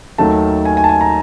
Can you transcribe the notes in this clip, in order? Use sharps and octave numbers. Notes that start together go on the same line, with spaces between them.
D#2 D#3 F#3 A3 A5
G#5
G#5
A5
G#5
A#5